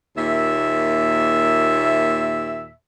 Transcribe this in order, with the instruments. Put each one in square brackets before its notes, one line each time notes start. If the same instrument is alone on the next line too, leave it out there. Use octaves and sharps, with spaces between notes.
[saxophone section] D#2 A#2 E5